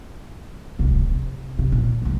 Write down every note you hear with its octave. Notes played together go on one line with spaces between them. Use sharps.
D1 C2
C3
C3
A#2
C2 G#3